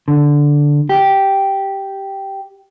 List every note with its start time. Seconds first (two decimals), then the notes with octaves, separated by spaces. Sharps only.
0.08 D3
0.89 G4